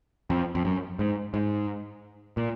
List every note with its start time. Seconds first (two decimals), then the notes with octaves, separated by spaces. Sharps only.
0.30 F2
0.55 F2
0.65 F#2
0.99 G#2
1.34 G#2
2.37 A#2